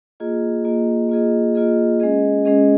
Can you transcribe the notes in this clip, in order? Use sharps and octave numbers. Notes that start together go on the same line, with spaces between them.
A#3 F4 G#4 D#5
A#3 F4 G#4 D#5
A#3 F4 G#4 D#5
A#3 F4 G#4 D#5
G#3 C#4 G#4 D#5
G#3 C#4 G#4 D#5